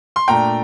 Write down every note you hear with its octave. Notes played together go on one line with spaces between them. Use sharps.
C6
A#2 A3 D4 G5 A#5